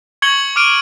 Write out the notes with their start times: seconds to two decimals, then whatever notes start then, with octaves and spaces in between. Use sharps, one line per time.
0.22 C#6 G#6 C#7 F#7 G7
0.56 D6 F6 D7 D#7